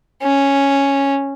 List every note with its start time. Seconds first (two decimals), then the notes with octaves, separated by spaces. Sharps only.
0.22 C#4